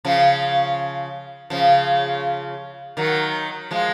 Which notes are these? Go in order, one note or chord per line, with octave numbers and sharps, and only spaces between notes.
C#3 F3
C#3 F3
D#3 F#3
F3 G#3